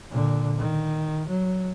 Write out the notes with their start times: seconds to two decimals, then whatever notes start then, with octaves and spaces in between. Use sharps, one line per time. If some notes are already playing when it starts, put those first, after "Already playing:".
0.11 A#2 D3
0.58 D#3
1.28 F#3